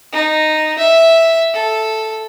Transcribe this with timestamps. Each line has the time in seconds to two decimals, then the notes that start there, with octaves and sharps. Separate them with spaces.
0.12 D#4
0.78 E5
1.54 A4